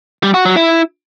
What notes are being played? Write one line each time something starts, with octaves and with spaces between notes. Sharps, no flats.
G3
F#4
F#3
E4